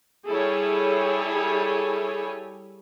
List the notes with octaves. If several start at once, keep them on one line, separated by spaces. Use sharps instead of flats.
G3 E4 G#4 A4 C#5 G#5